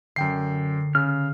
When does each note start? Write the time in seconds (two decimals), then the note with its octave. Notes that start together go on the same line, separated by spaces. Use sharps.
0.16 F#2 D3 G5 C7
0.95 C#3 F6